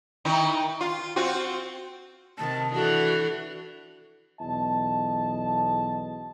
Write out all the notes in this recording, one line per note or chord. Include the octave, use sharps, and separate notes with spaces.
D#3 D#4 E4
F4
C4 F4 F#4
C3 D#3 A5
E3 D4 F#4 A4
B1 E2 D#5 A5